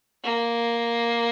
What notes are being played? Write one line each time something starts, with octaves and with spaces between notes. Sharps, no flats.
A#3